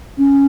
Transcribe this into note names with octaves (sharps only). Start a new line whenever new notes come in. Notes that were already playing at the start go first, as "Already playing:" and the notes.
C#4